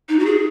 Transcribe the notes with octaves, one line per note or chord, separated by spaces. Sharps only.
D#4
F#4
G#4